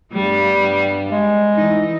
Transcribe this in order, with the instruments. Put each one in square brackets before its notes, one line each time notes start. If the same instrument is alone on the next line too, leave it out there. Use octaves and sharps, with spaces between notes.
[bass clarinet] G2 [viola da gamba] G3 B3
[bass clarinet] G2
G#3
[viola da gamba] E3 D#4